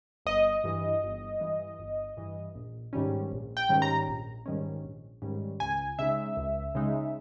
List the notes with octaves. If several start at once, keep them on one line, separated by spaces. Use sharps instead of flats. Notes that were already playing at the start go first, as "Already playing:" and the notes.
G1 D#5
G2 E3
G1
G2 E3
G1
G2 E3
A#1
G#2 D#3 G3 C#4
A#1
G5
G#2 D#3 G3 C#4
A#5
A#1
G#2 D#3 G3 C#4
A#1
G#2 D#3 G3 C#4
C#2 G#5
C#3 G#3 D#4 E5
C#2
C#3 G#3 D#4